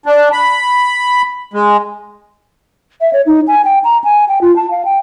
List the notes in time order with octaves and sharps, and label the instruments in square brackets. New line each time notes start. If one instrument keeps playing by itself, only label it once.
[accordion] D4
B5
G#3
[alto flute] E5
C#5
D#4
G#5
G5
A#5
G#5
G5
F4
A5
F5
G5